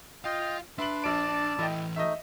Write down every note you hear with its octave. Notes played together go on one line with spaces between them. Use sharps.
F4 D#5 F5 G5
D4 B4 E5 C6 F#7
A#1 D5 A5 D7
E3 E4 A4 D#5 G5
A3 D#4 D#5 E5